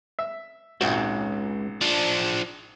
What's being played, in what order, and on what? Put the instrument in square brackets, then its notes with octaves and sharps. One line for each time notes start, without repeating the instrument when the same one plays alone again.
[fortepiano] E5
[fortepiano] G#1 A#2 F#4 [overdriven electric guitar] C#2
[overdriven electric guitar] F3 D4